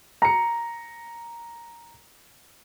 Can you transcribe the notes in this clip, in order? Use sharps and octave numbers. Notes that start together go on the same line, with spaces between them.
A#5 C#7